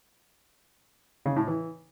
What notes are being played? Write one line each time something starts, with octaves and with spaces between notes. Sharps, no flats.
C#3
A2
E3